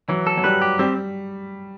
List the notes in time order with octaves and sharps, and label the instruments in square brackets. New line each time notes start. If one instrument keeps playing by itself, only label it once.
[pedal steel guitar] E3 [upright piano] F#3
[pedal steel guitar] A4
[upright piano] F#3
[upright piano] G3 [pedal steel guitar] B4
[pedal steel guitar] G4
[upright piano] G3 [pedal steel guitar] C4